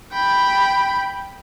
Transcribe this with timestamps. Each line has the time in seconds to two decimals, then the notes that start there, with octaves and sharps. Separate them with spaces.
0.13 G5 B5